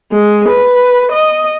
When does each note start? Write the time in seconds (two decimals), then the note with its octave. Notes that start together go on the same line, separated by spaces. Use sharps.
0.12 G#3
0.49 B4
1.12 D#5